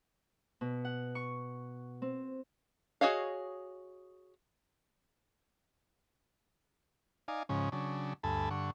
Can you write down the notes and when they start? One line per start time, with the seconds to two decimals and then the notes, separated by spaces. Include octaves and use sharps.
0.61 B2
0.85 F#5
1.15 C#6
2.02 C4
3.01 F#4 G#4 C#5 D#5 F5
7.28 D#4 D5 F5 G#5
7.49 G#2 C#3 F3 C#4
7.72 C#3 F#3 D4
8.23 D2 G2 A4 G#5 A5 B5
8.51 G2 D3 F#5 C#6